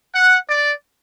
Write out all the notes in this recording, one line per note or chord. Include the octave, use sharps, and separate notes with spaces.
F#5
D5